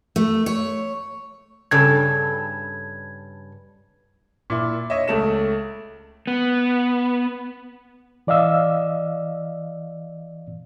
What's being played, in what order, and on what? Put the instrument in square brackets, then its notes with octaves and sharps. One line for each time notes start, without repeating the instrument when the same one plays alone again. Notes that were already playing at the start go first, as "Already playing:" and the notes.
[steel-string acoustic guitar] A3
C#5
[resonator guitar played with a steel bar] G2 C#3 A4 [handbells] G#6
[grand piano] A#2 E4
C#5 D#5 E5
C#2 A3 E7
[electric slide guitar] B3
[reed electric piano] E3 D5 D#5 F5 E6